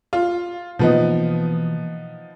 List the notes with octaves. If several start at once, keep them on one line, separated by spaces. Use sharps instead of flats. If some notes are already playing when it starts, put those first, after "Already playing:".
F4
B2 E3 F3 A#3 B3 D#4